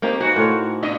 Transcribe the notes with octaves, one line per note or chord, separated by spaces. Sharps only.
A#3 C4 D#4 G4
G#2 F#4 G#4 B4
A2 F4 C#5
A#2 D4 D#5